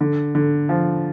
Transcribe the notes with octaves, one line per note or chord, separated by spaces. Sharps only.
D3
D3
F3